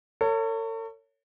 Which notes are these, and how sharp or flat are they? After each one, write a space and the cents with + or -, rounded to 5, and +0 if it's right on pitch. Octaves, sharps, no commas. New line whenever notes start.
A4 +45 C#5 +5